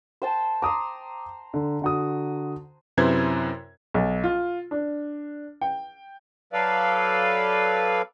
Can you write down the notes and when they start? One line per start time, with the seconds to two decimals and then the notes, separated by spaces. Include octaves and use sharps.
0.22 C5 G5 A5
0.62 A#5 C6 D6 D#6
1.54 D3
1.82 D3 F#4 D#6
2.97 F#2 C3 E4 B4 C5 G#6
3.94 B1
4.24 F4
4.71 D4
5.61 G5
6.53 F#3 A4 B4 D5 F5